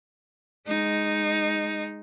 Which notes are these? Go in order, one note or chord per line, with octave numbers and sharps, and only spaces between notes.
G#3 D#4